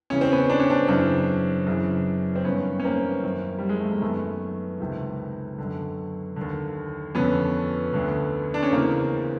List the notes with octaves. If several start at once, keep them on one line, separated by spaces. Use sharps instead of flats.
E2 C#3 E3 C#4
C4
B3 C#4
D4
C#4
C4 D4
F#2 C#3 E3 C4 D4
F#2 C#3 E3
C4
G2 D#3 B3 C#4
C#4
A#3 C4
F#2 D#3
G3
G#3
A3
A#3
F#2 D#3 A3 B3
C#2 C3 D#3
F#2 D3
D#2 D3
F2 D3 B3 C#4
D2 D3
D4
C#4
E2 C#3 E3 A#3 C4